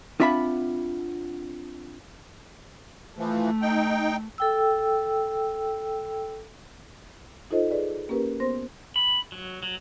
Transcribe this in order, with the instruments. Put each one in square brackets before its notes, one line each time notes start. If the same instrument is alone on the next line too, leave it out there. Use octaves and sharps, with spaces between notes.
[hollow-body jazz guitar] C4 D4 F4 E5 F#5 B5
[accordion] E3 F3 [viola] A3
[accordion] D#4 G5
[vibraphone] A4 G5 E6
[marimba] D#4 F4 A4 C5 D#5
G#4 B4 D5
A#3 C#4 G4 A#4 B4
B3 C5 C6 A#6
[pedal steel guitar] B5
F#3
F#3